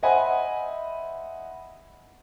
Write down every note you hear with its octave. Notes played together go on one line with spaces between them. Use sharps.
C5 D#5 E5 F#5 G#5 B5